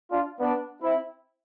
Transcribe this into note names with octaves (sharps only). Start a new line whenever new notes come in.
D4 F4
B3 D4
C4 E4